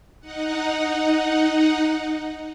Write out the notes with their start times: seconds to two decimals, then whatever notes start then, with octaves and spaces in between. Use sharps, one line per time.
0.20 D#4 F#5